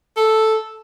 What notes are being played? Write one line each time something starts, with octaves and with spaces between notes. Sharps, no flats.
A4